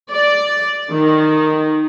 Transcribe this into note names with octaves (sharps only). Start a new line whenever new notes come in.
D5
D#3